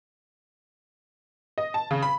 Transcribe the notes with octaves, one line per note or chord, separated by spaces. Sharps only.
D#5
A5
C#3
B5